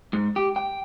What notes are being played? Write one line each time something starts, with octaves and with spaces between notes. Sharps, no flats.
G#2
G4
G5